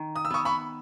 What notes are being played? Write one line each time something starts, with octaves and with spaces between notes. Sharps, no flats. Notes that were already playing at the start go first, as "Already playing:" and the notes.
Already playing: D#3
D#6
E6
B3 C#6 D#6
B5 C#6